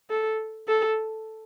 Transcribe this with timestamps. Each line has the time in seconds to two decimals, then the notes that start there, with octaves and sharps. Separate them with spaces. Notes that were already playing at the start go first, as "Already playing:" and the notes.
0.10 A4
0.68 A4